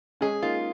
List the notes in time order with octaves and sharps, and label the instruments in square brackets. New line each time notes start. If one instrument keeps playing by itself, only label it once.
[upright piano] G#3 C#4 [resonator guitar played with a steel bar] G#4
[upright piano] A#3 D#4 [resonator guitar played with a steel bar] F4